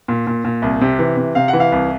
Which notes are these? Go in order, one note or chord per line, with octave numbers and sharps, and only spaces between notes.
A#2
A#2
A#2
C2
C3
E3
C3
C3 F5
F#5
E3
F5
C2